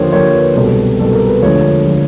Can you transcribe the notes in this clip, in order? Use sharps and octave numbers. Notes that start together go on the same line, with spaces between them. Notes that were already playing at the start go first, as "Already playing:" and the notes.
Already playing: D#2 D3 F3 C5 C#5
D#2 D3 F3 C#5
B4
C2 B2 F#3 A4
C2 B2 F#3 A4
A#4
B4
E1 D2 D3 F3 C#5
D3 F3